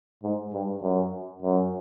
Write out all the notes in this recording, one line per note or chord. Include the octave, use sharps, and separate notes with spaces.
G#2
G2
F#2
F#2